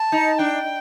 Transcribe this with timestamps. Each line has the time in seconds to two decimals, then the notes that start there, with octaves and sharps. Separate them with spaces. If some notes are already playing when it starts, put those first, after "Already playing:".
Already playing: A5
0.12 D#4
0.38 D4 G5